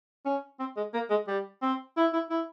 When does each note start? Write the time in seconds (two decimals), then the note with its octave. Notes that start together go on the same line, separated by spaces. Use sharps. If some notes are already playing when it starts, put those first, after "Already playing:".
0.25 C#4
0.59 C4
0.77 G#3
0.94 A#3
1.10 G#3
1.27 G3
1.62 C4
1.97 E4
2.13 E4
2.30 E4